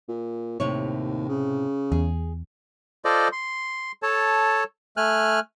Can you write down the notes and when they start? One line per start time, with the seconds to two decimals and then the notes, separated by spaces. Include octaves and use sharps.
0.08 A#2
0.60 D#2 A2 C3 C#5
1.29 C#3
1.92 E2 G#4
3.05 F4 A4 C5 D5 D#5
3.32 C6
4.03 A4 C#5 A5
4.97 A3 G#5 F6 F#6